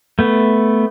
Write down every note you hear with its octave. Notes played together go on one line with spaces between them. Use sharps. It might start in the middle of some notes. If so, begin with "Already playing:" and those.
A3 B3